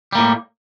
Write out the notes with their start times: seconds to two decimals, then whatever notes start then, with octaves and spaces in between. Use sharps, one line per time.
0.13 G3
0.15 A#3
0.18 A2